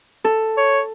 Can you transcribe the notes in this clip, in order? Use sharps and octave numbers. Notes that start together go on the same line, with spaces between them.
A4
C#5